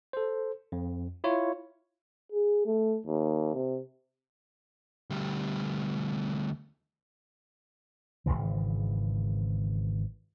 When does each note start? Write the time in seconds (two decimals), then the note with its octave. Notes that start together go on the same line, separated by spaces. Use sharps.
0.13 A4 C5
0.72 F2
1.24 E4 F4 C#5
2.32 G#4
2.66 A3
3.06 D#2
3.55 C3
5.10 D2 G3
8.26 G#1 C#2 C#3 E3